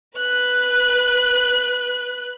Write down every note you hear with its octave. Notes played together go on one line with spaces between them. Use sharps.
B4 F#6